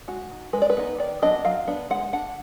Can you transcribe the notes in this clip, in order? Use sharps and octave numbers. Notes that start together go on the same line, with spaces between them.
G#3 F#4
D#4
G#3 B4
D5
B4
B3 D#4
D#3 D5
F#3 B3 D4 D#5
F#3 F5
B3 D4
G#3 F#5
D4 F#5